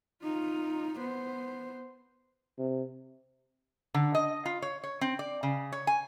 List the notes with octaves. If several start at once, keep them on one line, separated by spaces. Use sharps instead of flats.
D#4 F4
B3 C5
C3
D3
D#5
F4
C#5
C#5
C4
D5
C#3
C#5
G#5